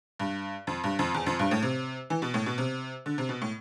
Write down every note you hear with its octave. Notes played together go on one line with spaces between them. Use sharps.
G2
F2
G2
F2
E2
F2
G2
A2
C3
E3
B2
A2
B2
C3
D3
C3
B2
A2